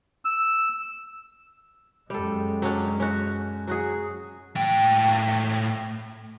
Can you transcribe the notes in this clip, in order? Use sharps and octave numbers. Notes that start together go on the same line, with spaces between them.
E6
F#2 G3 G#3 A4
F#3 C#4 D4
C#4 F#4
F#3 F#4 G#4
A2 G5